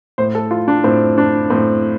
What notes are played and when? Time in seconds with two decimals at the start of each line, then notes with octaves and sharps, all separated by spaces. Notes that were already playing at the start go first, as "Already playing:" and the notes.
0.18 A2 C5
0.35 A4
0.51 F4
0.68 D4
0.84 A2 C4
1.18 D4
1.50 A2 C4